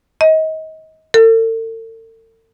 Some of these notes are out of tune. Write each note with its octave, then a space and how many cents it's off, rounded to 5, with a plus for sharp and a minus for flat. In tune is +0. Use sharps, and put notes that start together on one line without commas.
D#5 +30
A4 +40